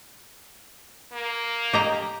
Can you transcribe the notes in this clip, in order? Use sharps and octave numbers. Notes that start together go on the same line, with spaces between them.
A#3
G4 D#5 A#5